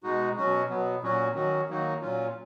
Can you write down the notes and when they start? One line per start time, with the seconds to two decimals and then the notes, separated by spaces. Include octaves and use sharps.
0.03 B2 G#3 D#4 F#4
0.37 B2 F#3 C#4 F#4
0.69 B2 F#3 B3
1.02 A#2 F#3 C#4 F#4
1.34 D#3 F#3 C#4 F#4
1.68 D#3 F#3 A#3 D#4 F#4
2.01 A#2 F#3 C#4 F4